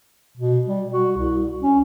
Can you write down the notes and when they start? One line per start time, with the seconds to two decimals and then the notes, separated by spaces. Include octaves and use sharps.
0.37 B2
0.67 G3
0.93 F#4
1.17 C2
1.62 C#4